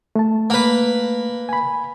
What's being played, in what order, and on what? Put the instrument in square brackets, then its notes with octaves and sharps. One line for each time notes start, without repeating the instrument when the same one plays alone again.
[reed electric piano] A3 A5
[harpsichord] A#3 B4
[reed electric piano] G#5 B5